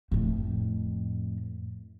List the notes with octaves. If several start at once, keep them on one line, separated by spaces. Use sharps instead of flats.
F2 A2